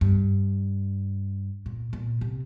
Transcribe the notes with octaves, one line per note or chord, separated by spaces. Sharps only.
G2
A#2
A#2
C3